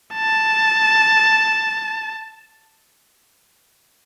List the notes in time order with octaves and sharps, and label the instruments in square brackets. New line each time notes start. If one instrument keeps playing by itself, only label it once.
[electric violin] A5